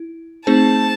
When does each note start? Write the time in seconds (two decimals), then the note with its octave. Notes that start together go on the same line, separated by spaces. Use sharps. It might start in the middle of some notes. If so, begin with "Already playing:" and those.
Already playing: E4
0.47 A3 C4 D#4 G#4 C5 A5